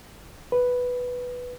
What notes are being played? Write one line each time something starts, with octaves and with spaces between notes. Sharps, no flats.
B4